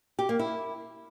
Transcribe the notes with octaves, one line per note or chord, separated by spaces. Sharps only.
G4
A#3
E4